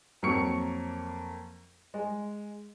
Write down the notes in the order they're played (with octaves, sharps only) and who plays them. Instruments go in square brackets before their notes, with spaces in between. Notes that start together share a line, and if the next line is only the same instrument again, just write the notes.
[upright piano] F2 F#3 A#3 A#4 C#6 C#7
G#3